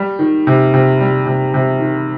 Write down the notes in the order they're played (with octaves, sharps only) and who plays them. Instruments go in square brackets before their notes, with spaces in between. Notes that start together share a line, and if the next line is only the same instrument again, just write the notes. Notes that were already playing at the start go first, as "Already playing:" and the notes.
Already playing: [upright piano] G3
D#3
C3
C3
G3
C3
C3
D#3